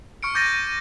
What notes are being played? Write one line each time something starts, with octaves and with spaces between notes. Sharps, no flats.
C#6 F6 C#7 D7
D6 G6 A6 A#6 D#7